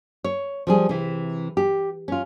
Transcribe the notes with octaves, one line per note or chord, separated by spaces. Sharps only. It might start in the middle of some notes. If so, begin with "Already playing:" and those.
C#5
F3 G3 G#4
C3 E3
G4
C#4 F4